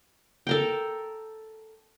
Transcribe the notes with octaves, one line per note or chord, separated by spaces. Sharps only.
A4 A#4 G5